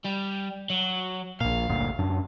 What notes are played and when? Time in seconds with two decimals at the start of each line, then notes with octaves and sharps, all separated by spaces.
0.05 G3
0.70 F#3
1.41 A#1 A#2 F5
1.69 G1 D2 A#2
1.99 F#2 D4